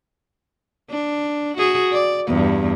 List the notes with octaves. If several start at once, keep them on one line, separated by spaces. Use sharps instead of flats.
D4
F#4 G#4
D5
E2 G2